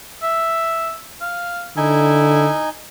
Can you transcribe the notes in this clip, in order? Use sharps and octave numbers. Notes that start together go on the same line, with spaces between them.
E5
F5
D3 D#4 E4 G#5